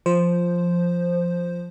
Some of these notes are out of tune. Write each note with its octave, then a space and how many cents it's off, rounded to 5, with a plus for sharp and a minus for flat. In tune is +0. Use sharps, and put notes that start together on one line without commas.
F3 +0 C5 +0